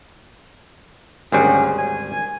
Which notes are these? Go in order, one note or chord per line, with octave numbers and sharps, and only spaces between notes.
G#1 D2 G3 C#4 G#4
G#5